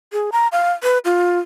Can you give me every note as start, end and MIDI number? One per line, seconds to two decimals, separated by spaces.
0.13 0.30 68
0.32 0.48 82
0.52 0.72 77
0.83 0.98 71
1.05 1.39 65